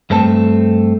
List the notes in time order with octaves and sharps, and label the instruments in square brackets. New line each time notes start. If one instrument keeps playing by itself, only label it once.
[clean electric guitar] G2 A3 C4 A4